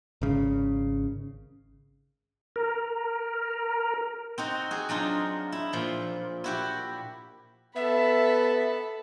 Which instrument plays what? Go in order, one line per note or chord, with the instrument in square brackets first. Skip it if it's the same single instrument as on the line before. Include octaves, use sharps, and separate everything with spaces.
[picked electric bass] G#1 C#3
[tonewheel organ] A#4
[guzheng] C4 D#4 F#4
F#4 G#4
F#3 D4 D#4 F4
E4
A#2 F3
E4 F#4 G4
[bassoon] B3 [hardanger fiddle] A4 B5 [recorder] E5